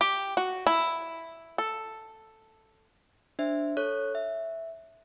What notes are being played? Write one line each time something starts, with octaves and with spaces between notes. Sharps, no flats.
G4
F#4
E4
A4
D4 C5 E5
A4 C#5 F#6
E5